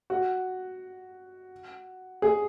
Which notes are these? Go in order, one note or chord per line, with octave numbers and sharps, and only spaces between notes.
F#4
G#4